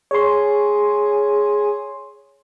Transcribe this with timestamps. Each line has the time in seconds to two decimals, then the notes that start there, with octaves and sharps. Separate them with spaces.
0.11 G#4 C#5 C6